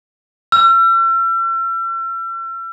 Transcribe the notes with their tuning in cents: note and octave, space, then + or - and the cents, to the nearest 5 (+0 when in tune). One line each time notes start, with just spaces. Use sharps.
E6 +45